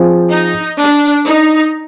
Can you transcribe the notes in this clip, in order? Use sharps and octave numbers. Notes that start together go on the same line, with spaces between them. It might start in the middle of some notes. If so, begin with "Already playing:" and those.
Already playing: F3 C4 F4 G#4 C5
D#4
D4
D#4